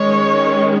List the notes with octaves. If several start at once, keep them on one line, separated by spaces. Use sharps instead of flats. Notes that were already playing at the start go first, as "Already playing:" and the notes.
Already playing: D#3 G#3 C#4 C#5